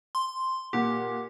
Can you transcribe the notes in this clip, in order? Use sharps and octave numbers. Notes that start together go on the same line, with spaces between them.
C6
A#2 G4 F#5